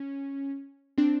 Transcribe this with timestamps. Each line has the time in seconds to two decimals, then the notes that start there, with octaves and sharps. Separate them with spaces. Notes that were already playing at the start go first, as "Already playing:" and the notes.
Already playing: C#4
0.98 C4 D4